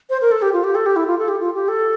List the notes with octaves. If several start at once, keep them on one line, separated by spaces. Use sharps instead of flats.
C5
A#4
A4
G4
F4
G4
A4
G4
E4
F4
A4
G4
F4
G4
A4